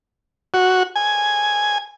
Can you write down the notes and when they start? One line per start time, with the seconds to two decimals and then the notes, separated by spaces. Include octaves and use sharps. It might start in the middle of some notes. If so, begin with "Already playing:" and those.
0.54 F#4
0.96 G#5